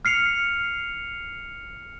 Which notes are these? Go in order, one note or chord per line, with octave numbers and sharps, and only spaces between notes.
F6 C7 C#7 F7